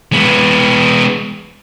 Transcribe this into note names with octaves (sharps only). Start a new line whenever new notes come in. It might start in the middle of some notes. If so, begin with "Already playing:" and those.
G#3 B3